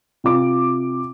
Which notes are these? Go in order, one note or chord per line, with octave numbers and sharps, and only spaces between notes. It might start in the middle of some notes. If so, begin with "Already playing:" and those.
C3 F4 D6